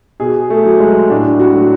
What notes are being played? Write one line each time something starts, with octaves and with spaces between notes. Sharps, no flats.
B2 G#4
A3
F#3
G#3
A2 D4
F#4
F#3